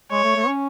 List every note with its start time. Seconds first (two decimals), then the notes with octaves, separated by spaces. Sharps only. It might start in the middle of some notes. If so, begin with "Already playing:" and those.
0.11 G#3 C#5
0.24 A3
0.36 A3
0.48 C#4